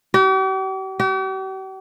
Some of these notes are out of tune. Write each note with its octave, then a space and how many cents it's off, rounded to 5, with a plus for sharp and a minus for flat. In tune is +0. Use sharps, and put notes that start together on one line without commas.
G4 -45
G4 -45